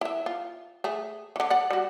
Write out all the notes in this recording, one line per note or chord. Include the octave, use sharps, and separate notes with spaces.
E4 E5
F4
A3 G#4
D3 E3
D5 F#5
G3 F#4